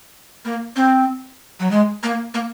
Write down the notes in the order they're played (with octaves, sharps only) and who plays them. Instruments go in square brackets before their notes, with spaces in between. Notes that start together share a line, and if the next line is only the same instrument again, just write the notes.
[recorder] A#3
C4
F#3
G#3
A#3
A#3